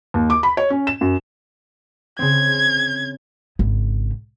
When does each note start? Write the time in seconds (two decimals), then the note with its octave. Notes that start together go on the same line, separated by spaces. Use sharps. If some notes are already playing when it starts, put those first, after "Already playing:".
0.14 D#2
0.30 D6
0.43 B5
0.57 C#5
0.70 C#4
0.87 E7
1.01 F#2
2.19 C#3 C4 G#6
3.59 G#1 C#3